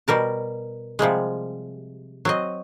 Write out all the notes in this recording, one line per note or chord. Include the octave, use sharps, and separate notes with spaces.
B2 G3 A#4 A5
C3 F3 G3 G#3
F#3 C4 D#5